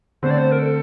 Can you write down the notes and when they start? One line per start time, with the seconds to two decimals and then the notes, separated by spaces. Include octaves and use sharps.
0.22 D3 A3 C4 C5
0.30 D5
0.38 C5
0.51 A#4
0.59 A4